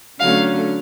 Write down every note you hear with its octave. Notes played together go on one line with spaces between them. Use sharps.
D3 F#3 A3 C#4 F5